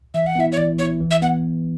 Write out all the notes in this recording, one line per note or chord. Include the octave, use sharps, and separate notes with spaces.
E3 E5
F#5
B3 E4 E5
C#5
E3 D5
B3 E4 C#5
E3
E5
B3 F#5